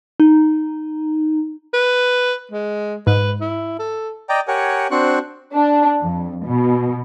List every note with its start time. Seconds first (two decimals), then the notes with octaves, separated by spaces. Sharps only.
0.20 D#4
1.74 B4
2.51 G#3
3.07 G#2 B4
3.41 E4
3.79 A4
4.29 D5 D#5 G5 A#5
4.48 G4 A#4 C#5 F#5 G#5
4.91 C4 D4 F#4 C5 C#6 F#6
5.53 D4
6.03 F2
6.45 B2